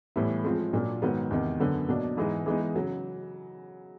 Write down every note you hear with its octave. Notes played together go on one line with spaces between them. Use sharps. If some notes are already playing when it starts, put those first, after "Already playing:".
A2 E3 G3 B3 E4
F3 G#3 C4 F4
A#2 F#3 A#3 D4
G#2 D#3 F#3 B3
E2 C3 D#3
F#2 D3 F#3 B3
B2 F#3 A#3 D4
G#2 E3 G#3 B3 D#4
E3 G#3 B3 D#4
C#3 F#3